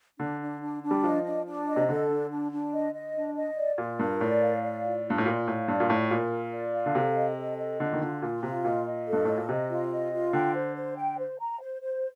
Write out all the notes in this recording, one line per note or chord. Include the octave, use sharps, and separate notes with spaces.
D3 D4
D4
D4
D4
G3
F3 D#5
D4
D4
D#5
C3
D3 A4
D4
D4
D4
D#5
D#5
D4
D#5
D5
A#2 F4
G2 A#4
A2 D5
F5
D5
F4
F4
G2
A2
A#2 D5
A2 F5
G2 D5
A#2
A2 F4
A#2 A#4
F4
D5
F5
D3
C3 A4
D#5
A4
D#5
D3 F4
D#3
D3 F4
A#2 F4
C3 F4
A#2 D#5
D#5
A4
G2
A2 D#5
A#2
C3 D#5
F4
D#5
F4
D3 G5
C5
C5
G5
C5
A#5
C5
C5